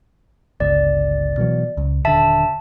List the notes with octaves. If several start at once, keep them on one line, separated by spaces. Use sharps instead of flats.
G1 C#2 D5
B2 E3 F#3
C#2
D#1 D3 E5 A5